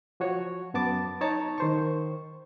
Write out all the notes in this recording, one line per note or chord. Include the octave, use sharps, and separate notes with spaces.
F3 F#4 C#5
F#2 B3 A5 D6 A6
D#4 C#5 A5 A#5
D#3 C5 C#6